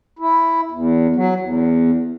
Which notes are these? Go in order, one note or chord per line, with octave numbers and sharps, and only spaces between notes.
E4
E2
F#3
E2